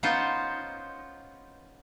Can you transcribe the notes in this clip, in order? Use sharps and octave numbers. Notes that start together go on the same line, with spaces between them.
B3 C#4 D#4 F4 C5